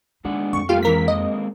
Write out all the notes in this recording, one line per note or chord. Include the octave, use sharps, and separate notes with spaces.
G#3 D4 D#4 F#5
F2 C#6
G3 A3 A#3 F4 G4 F5
E3 G#3 A#3 C4 A#4 B6
D#5